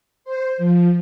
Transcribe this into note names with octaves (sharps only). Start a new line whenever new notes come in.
C5
F3